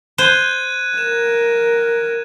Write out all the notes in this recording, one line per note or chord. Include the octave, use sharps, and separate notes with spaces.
C5 F#6 G#6 D#7
A#4 E7